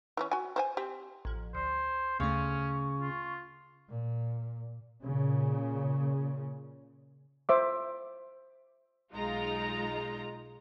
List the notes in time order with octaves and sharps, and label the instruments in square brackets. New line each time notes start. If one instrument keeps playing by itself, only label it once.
[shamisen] E3 A#3 C#4
F#4 G#5
C4 C5 G#5
C4 G4
[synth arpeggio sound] A1 F3
[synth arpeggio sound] D2 [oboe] C5
[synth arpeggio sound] D2 A3 [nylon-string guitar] C#3 [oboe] C#4 [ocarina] C#6
[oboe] F4
[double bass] A#2
[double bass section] A#2 C#3
[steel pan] C5 E5 D6
[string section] B1 G#3 D#4 F4 A#5